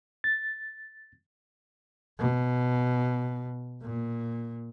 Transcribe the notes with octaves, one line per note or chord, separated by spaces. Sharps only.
A6
B2
A#2